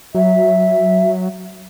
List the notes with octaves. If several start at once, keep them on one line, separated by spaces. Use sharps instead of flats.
F#3 E5